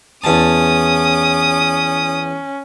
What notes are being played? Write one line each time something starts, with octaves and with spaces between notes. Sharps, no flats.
E2 C#4 A5 D#6